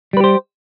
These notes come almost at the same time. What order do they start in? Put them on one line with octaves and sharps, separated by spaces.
G3 B4 G4 C5